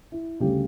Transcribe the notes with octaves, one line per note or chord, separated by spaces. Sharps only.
E4
D2 C#3 G3 G4